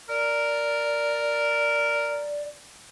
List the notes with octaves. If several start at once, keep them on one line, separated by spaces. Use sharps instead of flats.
A#4 D5